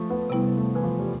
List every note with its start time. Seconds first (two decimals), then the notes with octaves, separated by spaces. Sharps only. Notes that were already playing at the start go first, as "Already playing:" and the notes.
Already playing: F3 A3
0.10 B3
0.30 C3 G3 B3 E4
0.57 A3
0.75 E3
0.83 F3
0.99 G3